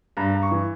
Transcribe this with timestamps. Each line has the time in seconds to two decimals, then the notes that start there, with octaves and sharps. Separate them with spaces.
0.17 G2 A#5
0.34 G2
0.42 C#6
0.51 E3